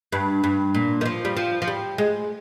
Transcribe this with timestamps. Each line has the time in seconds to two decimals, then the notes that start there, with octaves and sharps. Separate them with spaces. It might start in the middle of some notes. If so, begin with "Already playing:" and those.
0.12 G2
0.44 G2
0.75 A#2
1.01 D#3
1.06 F3
1.25 G3
1.37 F3
1.62 F3
1.68 G3
1.98 G#3